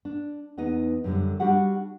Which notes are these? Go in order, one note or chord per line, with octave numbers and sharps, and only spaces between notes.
D4
E2 B3 D#4 D#5
F#2 D3 G3
G3 D4 F#4 G4 F#5